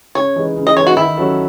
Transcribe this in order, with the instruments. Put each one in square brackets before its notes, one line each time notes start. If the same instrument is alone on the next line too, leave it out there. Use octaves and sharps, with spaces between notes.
[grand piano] C#3 [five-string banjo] C#5
[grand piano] E3 G#3 D#4
C#3
[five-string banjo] D#5
[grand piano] E3 G#3 D#4 [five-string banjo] C#5
[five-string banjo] F#4
[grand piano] D#3 [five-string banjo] E4
[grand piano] F#3 C#4 F#4 A4